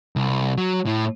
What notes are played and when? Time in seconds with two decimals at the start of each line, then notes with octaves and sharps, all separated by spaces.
0.16 C2
0.57 F#3
0.86 A2